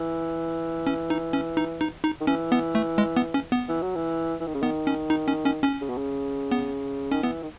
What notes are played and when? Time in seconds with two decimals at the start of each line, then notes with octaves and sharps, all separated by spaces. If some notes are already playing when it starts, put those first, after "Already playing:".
Already playing: E3
0.87 C#4
1.10 D#4
1.33 C#4
1.57 D#4
1.81 D#4
2.04 D#4
2.21 D#3
2.27 E3 C#4
2.52 B3
2.75 A3
2.98 G#3
3.16 B3
3.34 C#4
3.52 B3
3.69 E3
3.82 F#3
3.95 E3
4.40 E3
4.47 D#3
4.55 C#3
4.62 D#3 B3
4.87 C#4
5.10 D#4
5.28 C#4
5.46 C#4
5.64 C#4
5.82 C#3
5.89 B2
5.97 C#3
6.51 B3
7.12 D#3 C#4
7.23 E3 B3
7.43 D#3